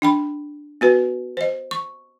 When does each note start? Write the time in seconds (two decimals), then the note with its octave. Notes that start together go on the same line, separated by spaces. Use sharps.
0.02 D4 G5 B5
0.81 B3 F#4 B4
1.37 C5 D#5
1.71 C#6